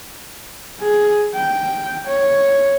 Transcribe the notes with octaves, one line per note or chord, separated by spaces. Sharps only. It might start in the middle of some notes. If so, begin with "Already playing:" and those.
G#4
G5
C#5